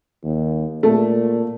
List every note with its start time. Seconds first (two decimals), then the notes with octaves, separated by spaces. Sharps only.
0.24 D#2
0.83 A#2 A3